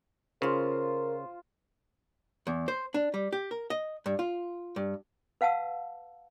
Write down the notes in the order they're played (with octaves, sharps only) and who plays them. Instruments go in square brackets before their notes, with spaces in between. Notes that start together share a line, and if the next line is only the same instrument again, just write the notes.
[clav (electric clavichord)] C#3 [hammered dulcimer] F4 C5 [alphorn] A#4
[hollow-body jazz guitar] E2
C5
D4
G3
G4
A#4
D#5
G2
F4
G2
[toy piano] B4 F5 F#5 A5 E6